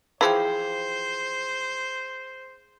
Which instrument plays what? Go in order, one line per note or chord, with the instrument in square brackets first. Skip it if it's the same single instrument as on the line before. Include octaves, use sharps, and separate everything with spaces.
[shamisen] E3 F3 [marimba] G#4 G5 [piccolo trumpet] C5